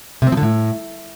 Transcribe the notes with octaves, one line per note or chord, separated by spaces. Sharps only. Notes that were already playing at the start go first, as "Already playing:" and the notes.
C3
C4
F3
D3
A2